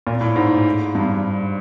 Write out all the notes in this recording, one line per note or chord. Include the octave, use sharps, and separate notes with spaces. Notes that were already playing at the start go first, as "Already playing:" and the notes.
A#2
A2
G#2
G2